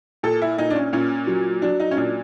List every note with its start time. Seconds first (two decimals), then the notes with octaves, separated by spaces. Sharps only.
0.23 A#2 A4
0.42 E4
0.58 A#2 D#4
0.70 D4
0.75 C#4
0.93 A#2 C#4
1.27 F#3
1.62 F#3 D4
1.80 D#4
1.91 C#4
1.97 A#2 D4